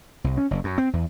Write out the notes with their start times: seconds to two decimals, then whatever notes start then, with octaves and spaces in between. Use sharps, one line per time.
0.24 C2
0.37 C#4
0.51 F#1
0.64 F#2
0.78 C4
0.93 E2